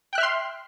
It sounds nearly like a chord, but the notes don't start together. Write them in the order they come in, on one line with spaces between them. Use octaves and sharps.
G5 F#6 E5 F6 C6